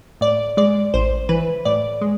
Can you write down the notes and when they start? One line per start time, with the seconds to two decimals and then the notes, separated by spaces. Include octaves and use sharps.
0.21 A2 D5
0.57 G#3 D5
0.94 A1 C5
1.29 E3 B4
1.65 A2 D5
2.01 G#3